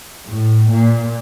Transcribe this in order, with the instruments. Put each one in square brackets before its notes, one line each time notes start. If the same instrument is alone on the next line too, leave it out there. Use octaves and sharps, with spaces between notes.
[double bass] A2
A#2